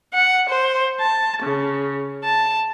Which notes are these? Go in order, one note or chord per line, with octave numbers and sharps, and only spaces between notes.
F#5
C5
A5
C#3
A5